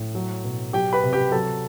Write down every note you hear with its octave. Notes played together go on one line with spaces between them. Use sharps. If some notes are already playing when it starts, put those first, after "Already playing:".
Already playing: A2
F#3
B2
F#3 G4 G5
B4 B5
C3
G4 G5
F#3 A4 A5